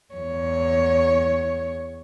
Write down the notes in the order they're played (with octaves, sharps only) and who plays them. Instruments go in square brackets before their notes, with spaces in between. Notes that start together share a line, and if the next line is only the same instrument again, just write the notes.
[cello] E2 C#5